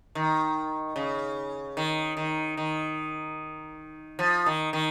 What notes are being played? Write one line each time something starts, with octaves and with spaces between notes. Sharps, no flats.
D#3
C#3
D#3
D#3
D#3
F3
D#3
D#3